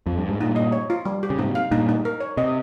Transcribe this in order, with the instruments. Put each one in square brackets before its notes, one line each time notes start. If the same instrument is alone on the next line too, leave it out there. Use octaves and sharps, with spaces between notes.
[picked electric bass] F2
G2
G#2
[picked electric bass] G2 A#2 [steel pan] D#4
[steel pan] D#5
C#5
F4
G3
G4
[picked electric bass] C#3
[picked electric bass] G#2 C3 [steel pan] D#4
[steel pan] F5
[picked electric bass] G2 A#2 [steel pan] D#4
[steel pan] D#4
A#4
C#5
[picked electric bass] C3 [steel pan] D#5